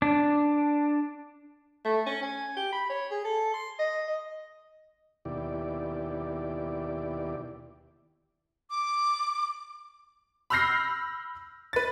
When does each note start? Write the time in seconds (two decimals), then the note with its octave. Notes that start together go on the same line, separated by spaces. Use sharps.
0.02 D4
1.85 A3
2.06 C#4
2.22 G#5
2.57 G4
2.72 B5
2.90 C#5
3.11 G#4
3.24 A4
3.54 C6
3.79 D#5
4.08 D#5
5.25 D#2 B2 E4 G4 D5
8.70 D6
10.50 B5 E6 F6 G6 A#6 C7
11.73 B4 A6